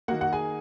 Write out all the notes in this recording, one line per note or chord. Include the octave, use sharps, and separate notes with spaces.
D#3 A#3 F#4 F#5
F#4 F#5
G#4 G#5